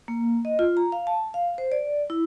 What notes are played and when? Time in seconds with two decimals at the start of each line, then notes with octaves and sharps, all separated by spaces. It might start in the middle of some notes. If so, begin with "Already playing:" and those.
0.08 A#3
0.45 D#5
0.59 F4
0.77 A#5
0.92 F5
1.07 A5
1.34 F5
1.58 C5
1.72 D5
2.10 E4